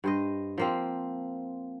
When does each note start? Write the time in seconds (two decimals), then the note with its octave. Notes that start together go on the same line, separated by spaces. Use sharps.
0.04 G2 C5 D#5
0.58 F3 A#3 C4